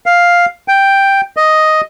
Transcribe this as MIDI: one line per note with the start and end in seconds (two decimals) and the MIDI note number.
0.06 0.46 77
0.68 1.21 79
1.37 1.81 75